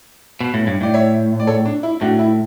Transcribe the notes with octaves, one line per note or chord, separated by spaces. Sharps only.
B2
A2
G2
A2 D5
C#5 E5
D5
A4 C#5
D4
E4
A2 D4 F#4
E4